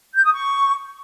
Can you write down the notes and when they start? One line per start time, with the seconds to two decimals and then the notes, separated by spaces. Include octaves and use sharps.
0.15 G6
0.25 D#6
0.35 C#6